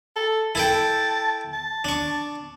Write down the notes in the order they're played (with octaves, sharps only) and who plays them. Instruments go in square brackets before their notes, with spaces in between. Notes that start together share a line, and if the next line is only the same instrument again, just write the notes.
[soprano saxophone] A4
[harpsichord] E4 A4 G5 [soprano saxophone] A5
[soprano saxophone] A5
[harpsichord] D4 C#6